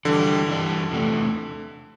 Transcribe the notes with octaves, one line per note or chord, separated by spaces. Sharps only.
D3 E3 G3 D4
E3 G3 D4
E2 C3 E3 A3